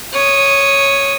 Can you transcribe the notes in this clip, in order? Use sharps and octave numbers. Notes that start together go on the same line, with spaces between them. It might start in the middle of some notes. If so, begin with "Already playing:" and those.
C#5 D#6